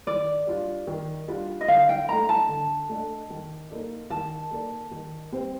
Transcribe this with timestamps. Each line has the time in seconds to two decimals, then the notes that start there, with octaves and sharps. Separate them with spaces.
0.07 D#3 D5
0.47 G3 D4 F4
0.87 D#3
1.28 G3 D4 F4
1.61 D#5
1.68 D3 F5
1.89 G5
2.09 A3 D4 A4 D#5 A#5
2.29 A5
2.49 D3
2.89 A3 D4 A4 D#5
3.30 D#3
3.70 A#3 D#4 A4 D5
4.10 D#3 A5
4.51 A#3 D#4 A4 D5
4.91 D#3
5.32 G3 C4 G4 C5